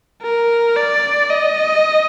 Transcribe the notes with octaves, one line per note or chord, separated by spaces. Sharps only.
A#4
D5
D#5